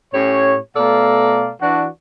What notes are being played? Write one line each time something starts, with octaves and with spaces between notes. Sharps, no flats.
A2 C#4 G4 C#5
B2 A3 A4 D5 F5 A#5
E3 D4 F#4